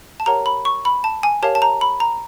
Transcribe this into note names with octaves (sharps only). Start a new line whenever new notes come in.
A5
G4 A#4 C#5 F#5 A#5
B5
C#6
B5
A5
G#5
G4 A#4 C#5 F5 A5
A5
A#5
B5
A#5